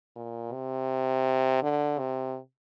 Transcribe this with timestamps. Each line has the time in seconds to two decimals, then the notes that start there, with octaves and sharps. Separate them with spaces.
0.16 A#2
0.53 C3
1.63 D3
1.99 C3